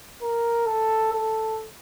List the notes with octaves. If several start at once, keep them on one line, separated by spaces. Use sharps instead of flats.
A#4
A4
A4